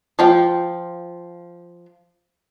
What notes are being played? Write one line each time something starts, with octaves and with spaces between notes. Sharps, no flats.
F3 F4 G5